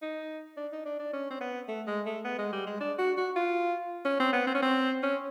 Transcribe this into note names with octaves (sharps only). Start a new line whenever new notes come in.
D#4
D4
D#4
D4
D4
C#4
C4
B3
A3
G#3
A3
B3
G#3
G3
G#3
D4
F#4
F#4
F4
C#4
C4
B3
C4
C#4
C4
C#4